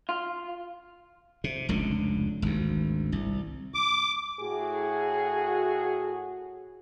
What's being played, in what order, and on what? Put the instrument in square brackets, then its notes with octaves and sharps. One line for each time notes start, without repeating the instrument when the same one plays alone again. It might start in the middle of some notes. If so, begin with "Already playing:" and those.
[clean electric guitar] F4
[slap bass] C3
F1 C#2 D3
G#1 D2
C2
[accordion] D6
[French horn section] A2 F#4 G#4